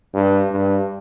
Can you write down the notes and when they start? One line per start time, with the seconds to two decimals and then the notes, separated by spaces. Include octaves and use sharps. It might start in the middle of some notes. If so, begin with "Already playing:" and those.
0.14 G2
0.51 G2